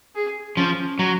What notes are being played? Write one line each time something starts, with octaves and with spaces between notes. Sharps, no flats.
G#4
F3 C#4
F#3